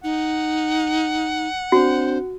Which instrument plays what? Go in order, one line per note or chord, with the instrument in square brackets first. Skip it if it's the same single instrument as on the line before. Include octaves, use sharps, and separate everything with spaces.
[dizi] D#4 [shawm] F#5
[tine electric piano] C4 D4 [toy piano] F#4 [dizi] C5